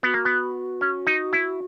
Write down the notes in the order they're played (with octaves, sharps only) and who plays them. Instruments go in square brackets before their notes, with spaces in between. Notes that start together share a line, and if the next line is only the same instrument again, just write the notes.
[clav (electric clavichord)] B3 [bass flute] F#4
[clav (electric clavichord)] A#3
B3
C#4
D#4
E4